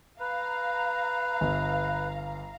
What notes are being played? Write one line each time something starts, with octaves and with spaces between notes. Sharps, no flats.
B4 F5 A#5
G1